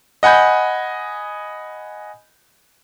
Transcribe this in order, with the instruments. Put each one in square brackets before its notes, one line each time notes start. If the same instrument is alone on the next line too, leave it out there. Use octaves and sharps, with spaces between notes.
[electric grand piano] D#5 F#5 G#5 B5 G6